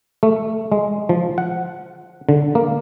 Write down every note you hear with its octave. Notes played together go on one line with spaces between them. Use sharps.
A3
G#3
F3
F#5
D3
A#3